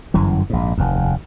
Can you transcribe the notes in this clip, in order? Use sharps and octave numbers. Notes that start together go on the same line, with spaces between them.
G1 F#2 E3
A#1 G#2
F1 D#2